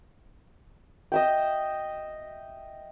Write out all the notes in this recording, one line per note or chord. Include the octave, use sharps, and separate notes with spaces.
D#5 E5 G5